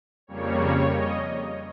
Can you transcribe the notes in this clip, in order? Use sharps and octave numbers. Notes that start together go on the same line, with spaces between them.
F2 C#3 G3 A#3 C#5
C#5
D#5